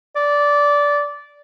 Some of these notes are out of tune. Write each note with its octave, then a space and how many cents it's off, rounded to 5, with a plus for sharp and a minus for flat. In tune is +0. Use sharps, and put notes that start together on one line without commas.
D5 -15